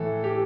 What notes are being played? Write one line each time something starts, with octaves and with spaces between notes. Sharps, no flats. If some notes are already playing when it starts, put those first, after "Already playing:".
Already playing: A2 E3 A4
G4